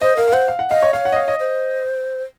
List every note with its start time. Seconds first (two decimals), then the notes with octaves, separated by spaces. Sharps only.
0.01 C5 D#5
0.17 A#4 F5
0.28 F5
0.33 C5 F#5
0.48 F5
0.59 F#5
0.70 D#5 F5
0.82 C#5
0.93 C#5 F5
1.05 F#5
1.12 D#5
1.16 F5
1.28 D#5
1.40 C5